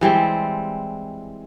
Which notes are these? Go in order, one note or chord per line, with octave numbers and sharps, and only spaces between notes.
E3 G3 G#3 C4